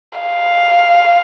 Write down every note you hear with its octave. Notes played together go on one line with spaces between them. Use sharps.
F5